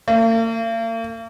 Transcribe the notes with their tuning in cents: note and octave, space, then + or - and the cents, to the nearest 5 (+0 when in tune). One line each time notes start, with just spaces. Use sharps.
A#3 -45